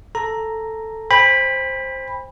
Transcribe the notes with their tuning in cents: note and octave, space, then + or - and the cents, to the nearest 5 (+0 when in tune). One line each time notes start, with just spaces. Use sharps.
A4 +5 A#5 +0
C5 +5 G5 +40 B5 -5